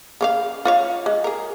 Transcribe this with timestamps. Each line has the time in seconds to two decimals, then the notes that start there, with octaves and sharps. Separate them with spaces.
0.21 C#3 C#4 F5
0.65 F4 C#5 F5
1.06 G#3
1.24 G#4 A#4